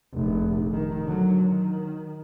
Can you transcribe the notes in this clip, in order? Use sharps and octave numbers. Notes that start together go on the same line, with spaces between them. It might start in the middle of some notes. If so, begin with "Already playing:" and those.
F1 A#1
D#3
D3 F#3
D#3